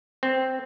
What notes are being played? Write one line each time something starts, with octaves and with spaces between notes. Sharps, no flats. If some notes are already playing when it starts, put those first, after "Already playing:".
C4